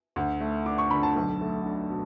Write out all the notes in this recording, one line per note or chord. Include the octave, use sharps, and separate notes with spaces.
D2
A3
D4 D6
C#6
D3 B5
A5
B1
A3
D4
B2